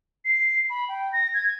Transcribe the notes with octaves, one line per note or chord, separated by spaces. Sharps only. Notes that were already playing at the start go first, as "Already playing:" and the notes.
C7
B5
G5
A#6
G#6